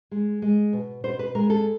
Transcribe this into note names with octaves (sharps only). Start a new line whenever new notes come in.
G#3
G#3
B2
B2 C5
B4
G#3 A#4
A4